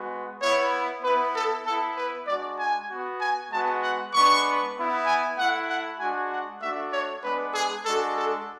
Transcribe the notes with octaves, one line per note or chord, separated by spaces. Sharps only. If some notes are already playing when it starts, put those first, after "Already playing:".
Already playing: G#3 B3 F#4
B3 E4 C#5
B3 E4 B4
A4
B3 E4 A4
B4
G#3 D4 F#4 D5
G#5
B3 F#4
G#5
G#3 B3 F#4 A5
F#5
G#3 B3 D4 C#6
B3 E4
G#5
A3 E4 F#5
F#5
G#3 D4 F#4 G#5
F#5
A3 D4 F#4 E5
C#5
G#3 B3 D4 B4
G#4
G#3 D4 F#4 A4
A4